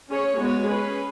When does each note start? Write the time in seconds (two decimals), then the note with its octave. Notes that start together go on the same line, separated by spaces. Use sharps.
0.09 C#4 G#4 C#5
0.39 G#3 B3 F#4 C#5
0.68 C#4 G#4 B4